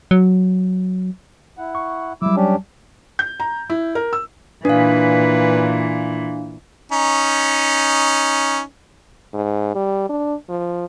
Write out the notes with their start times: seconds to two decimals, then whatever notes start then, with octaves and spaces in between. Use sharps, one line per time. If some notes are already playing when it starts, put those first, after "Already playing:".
0.11 F#3
1.58 E4 F#5
1.75 C#6
2.22 F#3 G3 E4 D6 E6
2.36 C#4 D4 G4
3.19 G6
3.40 A#5
3.70 E4
3.95 A#4
4.13 E6
4.65 A#2 E3 D4 B4 F5
6.92 C#4 D#4
9.34 G#2
9.75 G3
10.09 D4
10.49 F3